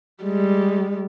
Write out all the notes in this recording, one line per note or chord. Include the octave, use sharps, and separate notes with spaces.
G3 G#3